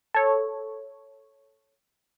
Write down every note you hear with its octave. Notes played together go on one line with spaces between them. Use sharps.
A4 C#5